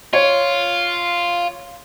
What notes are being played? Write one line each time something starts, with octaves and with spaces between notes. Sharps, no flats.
F4 C#5